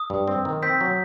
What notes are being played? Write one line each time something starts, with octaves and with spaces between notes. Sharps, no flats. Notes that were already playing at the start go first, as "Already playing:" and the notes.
Already playing: D#6
G2
C4
D#3
C4 G6 B6
F#3